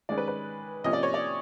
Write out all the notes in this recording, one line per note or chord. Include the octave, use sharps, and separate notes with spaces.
D#3 G#3 C#4 D5
B4
B4
C3 F3 A#3 C#4 D#5
D5
C#5
D5